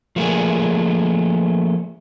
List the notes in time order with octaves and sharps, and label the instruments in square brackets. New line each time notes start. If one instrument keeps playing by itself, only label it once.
[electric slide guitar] F3 A3 A#3 G#4